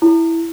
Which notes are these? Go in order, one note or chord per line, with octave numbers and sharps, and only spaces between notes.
E4